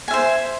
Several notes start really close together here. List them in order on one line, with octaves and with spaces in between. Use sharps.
G#5 E5 C5